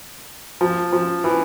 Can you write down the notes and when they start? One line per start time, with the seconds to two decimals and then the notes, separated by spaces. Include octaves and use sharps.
0.61 F3
0.93 F3
1.24 E3